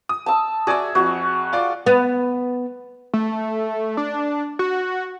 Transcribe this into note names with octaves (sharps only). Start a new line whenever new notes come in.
D#6
A5 E6
F#4 G#4 D5 E5
F2 F#4
F4 D5 D6
B3
A3
D4
F#4